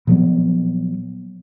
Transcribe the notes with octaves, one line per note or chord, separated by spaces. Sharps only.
A#2 F3 F#3 B3